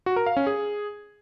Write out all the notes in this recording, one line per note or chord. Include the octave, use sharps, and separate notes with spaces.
F#4
A#4
F5
C#4
G#4